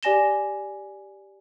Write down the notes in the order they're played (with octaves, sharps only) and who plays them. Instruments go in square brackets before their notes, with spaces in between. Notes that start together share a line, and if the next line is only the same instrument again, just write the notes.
[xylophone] G4 D5 G#5 A#6 E7 G7